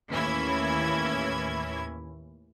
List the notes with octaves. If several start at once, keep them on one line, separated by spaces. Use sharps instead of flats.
D#2 A2 E3 C#4 E4 G#6